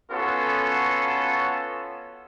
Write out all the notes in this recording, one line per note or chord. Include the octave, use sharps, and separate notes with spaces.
B3 C#4 F4 F#4 A4